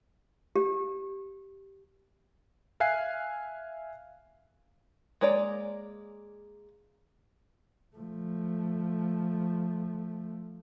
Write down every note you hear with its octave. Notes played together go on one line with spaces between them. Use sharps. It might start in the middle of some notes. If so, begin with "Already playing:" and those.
G4
E5 F5 G#5 F#6 C7
G#3 A#3 C#5 D5 A#5
F3 A3